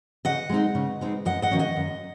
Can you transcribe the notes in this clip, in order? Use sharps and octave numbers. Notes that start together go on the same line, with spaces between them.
C#3 D#5 F#5
G#3 C4 D#4
C#3
G#3 C4 D#4
F#2 D#5 F#5
D#5 F#5
D#3 F#3 C#4
D#5 F#5
F#2